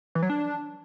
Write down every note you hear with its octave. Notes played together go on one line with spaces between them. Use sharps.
E3
F#3
D4